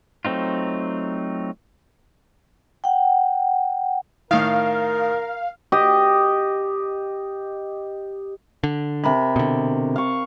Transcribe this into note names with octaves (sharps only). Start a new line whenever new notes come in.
F#3 A3 C4 D#4 F4
F#5 G5
A2 D#3 A#4 F5
G4 D#5
D3
C3 A#4 B5
B2 D3
F5 C#6